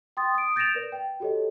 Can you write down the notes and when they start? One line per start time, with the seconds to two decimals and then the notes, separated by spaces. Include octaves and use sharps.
0.17 G5 C6 D#6 A6
0.35 D#6 D7
0.56 G6 A6 A#6 D7 E7 F7
0.75 A#4 B4 D5
0.92 G5
1.20 F#4 G4 A4 C#5 D#5